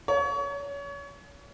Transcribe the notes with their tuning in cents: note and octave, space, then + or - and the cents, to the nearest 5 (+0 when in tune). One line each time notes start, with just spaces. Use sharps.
C#5 +30